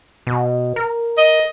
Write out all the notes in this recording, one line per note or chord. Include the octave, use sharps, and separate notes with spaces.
B2
A#4
D#5